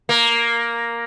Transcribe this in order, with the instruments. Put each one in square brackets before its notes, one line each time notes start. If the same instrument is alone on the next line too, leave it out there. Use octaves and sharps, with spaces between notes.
[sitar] A#3